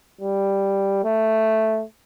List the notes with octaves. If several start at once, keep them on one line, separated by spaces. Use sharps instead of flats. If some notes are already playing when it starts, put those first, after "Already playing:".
G3
A3